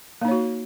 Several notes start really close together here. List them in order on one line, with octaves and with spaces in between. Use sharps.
A#3 D#4 C#5 F#4